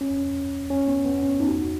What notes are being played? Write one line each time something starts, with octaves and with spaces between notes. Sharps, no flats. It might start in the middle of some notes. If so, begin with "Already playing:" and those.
C#4
C#4
B3
B3
C#4
D#4
F#4